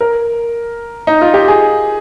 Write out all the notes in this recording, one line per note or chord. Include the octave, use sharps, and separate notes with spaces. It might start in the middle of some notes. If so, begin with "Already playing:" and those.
A#4
D#4
F4
G4
G#4